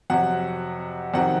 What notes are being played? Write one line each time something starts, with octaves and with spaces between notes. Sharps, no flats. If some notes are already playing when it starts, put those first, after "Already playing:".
F2 C3 F#3 F#5
F2 C3 D#3 F#3 F#5